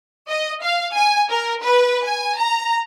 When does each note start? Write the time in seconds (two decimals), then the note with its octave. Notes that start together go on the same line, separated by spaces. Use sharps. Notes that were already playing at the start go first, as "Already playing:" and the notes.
0.30 D#5
0.62 F5
0.96 G#5
1.30 A#4
1.62 B4
2.05 G#5
2.39 A#5